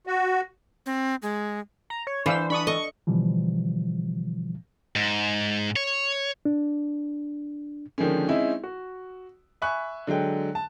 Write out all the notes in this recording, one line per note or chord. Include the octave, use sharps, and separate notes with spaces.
F#4
C4
G#3
A#5
C#5
E3 D4 C5 F5 E6
D4 B5 C#6 D#6
A4 D#5 C#6
B2 D3 E3 F3 G3
G#2
C#5
D4
D3 D#3 F3 G#3 A#3 C#4
G#3 C4 C#4 D#4 E4 E5
F#4
E5 G#5 B5 C#6 F#6
D3 F#3 G#3 G5
A5